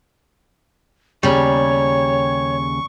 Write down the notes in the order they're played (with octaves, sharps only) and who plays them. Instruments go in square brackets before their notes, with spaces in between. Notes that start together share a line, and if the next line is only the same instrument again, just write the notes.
[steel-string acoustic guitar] D#2 C#3 A#5 [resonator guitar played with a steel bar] G3 [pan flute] C#5 [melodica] C#6